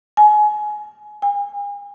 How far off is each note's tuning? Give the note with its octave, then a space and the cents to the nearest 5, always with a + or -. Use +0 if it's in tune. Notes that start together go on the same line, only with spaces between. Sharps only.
G#5 +25
G#5 -40